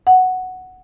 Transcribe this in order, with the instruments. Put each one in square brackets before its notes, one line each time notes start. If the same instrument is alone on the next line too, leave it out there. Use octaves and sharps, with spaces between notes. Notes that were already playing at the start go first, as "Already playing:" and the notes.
[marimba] F#5